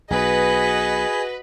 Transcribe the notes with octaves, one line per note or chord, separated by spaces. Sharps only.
B1 F#4 G#4 B4 D#5